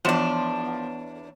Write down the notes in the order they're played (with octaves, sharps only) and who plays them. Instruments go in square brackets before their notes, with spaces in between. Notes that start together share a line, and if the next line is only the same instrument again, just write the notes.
[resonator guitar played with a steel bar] E2 D4 [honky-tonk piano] F3 C6 E7 [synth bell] B3 C#5